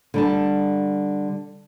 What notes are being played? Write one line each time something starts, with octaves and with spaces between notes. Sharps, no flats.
D3 G3 A5